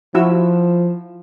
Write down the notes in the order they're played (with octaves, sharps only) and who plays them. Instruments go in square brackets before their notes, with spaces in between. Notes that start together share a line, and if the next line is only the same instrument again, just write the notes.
[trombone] F3 [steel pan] E4 F#4 E6